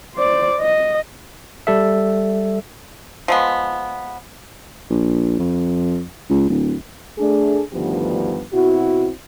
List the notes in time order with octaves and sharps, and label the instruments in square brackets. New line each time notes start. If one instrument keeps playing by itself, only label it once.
[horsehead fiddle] C5 D5
D#5
[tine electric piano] G3 A4 E5
[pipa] F3 G#3 B3
[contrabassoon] A#1
F2
C#2
D1
[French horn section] A3 D4 G#4
D2 G2 D#3 F3 B3 G4
B2 C4 E4 F#4